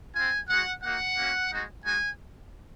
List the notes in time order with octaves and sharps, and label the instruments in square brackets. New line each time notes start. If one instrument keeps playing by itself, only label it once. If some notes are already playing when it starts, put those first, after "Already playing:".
[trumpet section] C4 F4 G#5
G#3 D#4 F#4 F#5
A#3 D#4 F#4 F#5
A#3 C#4 F#4
G#3 D#4 F#4
G#3 D#4 F#4 G#5